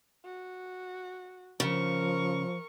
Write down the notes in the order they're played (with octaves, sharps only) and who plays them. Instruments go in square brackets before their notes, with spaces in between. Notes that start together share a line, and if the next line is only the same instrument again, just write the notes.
[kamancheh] F#4
[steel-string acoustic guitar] C#3 [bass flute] F3 [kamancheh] A#4 C#6